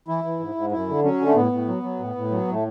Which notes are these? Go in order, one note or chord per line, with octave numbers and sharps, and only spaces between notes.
E3 E4
E3
G#2
G#2
F#2 E4
D3
F#3 C#4
D3
A3
A2 B3
A2
F#3
F#3
A2
A2
F#3
A2 A3